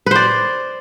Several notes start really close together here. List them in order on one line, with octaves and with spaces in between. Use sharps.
B4 C5 D5